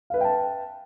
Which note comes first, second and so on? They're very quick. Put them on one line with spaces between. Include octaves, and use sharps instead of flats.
F5 B4 E5 G5 A5